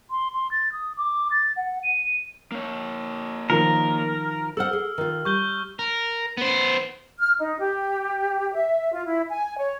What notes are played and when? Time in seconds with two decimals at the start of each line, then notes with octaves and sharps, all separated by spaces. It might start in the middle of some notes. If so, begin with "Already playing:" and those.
0.11 C6
0.34 C6
0.51 A6
0.72 D#6
0.97 D6
1.31 A6
1.56 F#5
1.83 D#7
2.52 A#3 C#5
3.50 D#3 F3 A#4
4.57 A4 C5 F#5 E6 F6
4.73 G#4
4.98 D#3 F4
5.25 G3 C#6 G6 G7
5.79 A#4
6.37 B3 C5
7.19 F6
7.39 D#4
7.59 G4
8.54 E5
8.92 F4
9.06 E4
9.29 G#5
9.58 C#5